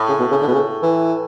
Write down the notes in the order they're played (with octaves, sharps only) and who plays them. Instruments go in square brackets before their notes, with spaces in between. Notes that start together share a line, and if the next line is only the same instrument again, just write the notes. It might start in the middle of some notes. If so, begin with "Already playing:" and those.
Already playing: [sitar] A2
[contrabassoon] C#3
B2
C#3
D3
B2
C#3
E3